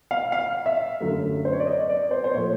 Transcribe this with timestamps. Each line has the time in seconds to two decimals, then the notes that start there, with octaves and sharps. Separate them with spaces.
0.11 F5
0.32 F5
0.66 E5
1.00 F#2 D3 F#3 A3
1.45 C5
1.53 C#5
1.60 D5
1.67 D#5
1.81 D#5
1.90 D5
2.11 C5
2.24 C5
2.34 A#2 F3 A3 C#5